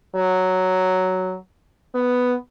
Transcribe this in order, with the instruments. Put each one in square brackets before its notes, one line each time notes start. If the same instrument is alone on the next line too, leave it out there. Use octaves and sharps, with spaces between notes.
[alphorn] F#3
B3